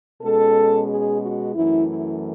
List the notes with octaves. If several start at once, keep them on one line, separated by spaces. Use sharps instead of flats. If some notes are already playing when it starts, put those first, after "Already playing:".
B2 G#3 C#4 A4
G#4
F#4
F#2 E3 A3 E4
E4